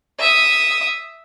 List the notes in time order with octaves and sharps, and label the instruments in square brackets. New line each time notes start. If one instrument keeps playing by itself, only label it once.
[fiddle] E5 D#6